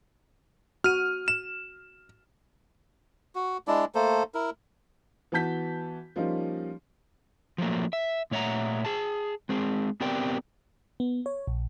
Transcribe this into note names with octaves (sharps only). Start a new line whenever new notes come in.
F#4 F6 D#7
E7
F#4
G#3 D4 E4 D5
A3 A#3 A4 C5
E4 A#4
E3 B3 F#4 A5 G6 B6
F3 G3 A#3 C#4 D#4
F3 F#3 A3 A#3
E5
A#2 A3 C#5 E5 F#5 A#5
G#4 A5
G#3 C4 G#4
B3 C4 G4 A#4 D5 G5
B3
C#5
A#1